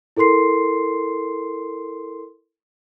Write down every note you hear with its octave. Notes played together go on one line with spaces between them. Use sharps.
E4 A4 A#4 C6 C7